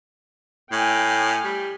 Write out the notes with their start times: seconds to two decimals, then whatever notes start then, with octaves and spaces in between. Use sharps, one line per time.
0.72 A2 G5 G#5 F6
1.45 G3